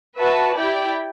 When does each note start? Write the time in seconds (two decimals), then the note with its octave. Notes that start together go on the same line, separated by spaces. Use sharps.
0.19 F#4 B4 E5 A5
0.57 E4 G4 D5 G5